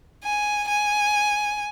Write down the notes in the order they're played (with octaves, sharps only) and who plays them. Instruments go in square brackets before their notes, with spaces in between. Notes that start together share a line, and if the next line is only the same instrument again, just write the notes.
[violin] G#5
G#5